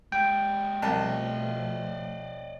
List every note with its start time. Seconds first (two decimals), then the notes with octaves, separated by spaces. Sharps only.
0.12 G#3 G4 G5
0.82 C2 B2 F3 A3 D5 D#5 A5